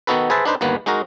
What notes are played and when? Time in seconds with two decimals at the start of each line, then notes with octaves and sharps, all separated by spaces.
0.07 D#3 B3 D#4 F#4 A4 B4
0.30 G#4 B4 C5 E5 A5
0.45 D4 D#4 B4 C5
0.61 G1 D#2 A#3 B3 B4
0.86 G#3 D#4 F#4 A#4